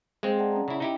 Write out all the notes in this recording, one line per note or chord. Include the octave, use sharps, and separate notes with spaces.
G#3 C4 G#4 F5 C6
D5 F#5 A5
C#4 A#5
C#3 E4
D#4 E4 G4